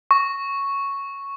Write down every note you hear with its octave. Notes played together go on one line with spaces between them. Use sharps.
C#6